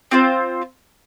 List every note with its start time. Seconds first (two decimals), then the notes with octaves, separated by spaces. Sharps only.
0.11 C4 F4 C5